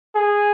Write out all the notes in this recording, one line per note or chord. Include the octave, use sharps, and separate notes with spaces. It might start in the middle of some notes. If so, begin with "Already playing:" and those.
G#4